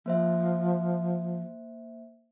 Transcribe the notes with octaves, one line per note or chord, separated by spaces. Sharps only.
F3 A#3 C5 E5